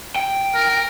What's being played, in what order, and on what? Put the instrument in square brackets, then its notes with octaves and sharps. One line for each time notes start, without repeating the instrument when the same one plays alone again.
[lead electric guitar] G5
[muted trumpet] A#4